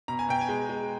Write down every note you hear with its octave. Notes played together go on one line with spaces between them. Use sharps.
B2 A#5
G#5
B2 G5
G#5
G#3
G#3